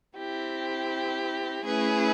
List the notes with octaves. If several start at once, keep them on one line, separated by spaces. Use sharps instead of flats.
C4 E4 G4
A3 C#4 E4 G#4 B4